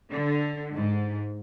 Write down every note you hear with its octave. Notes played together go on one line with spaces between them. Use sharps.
D3
G#2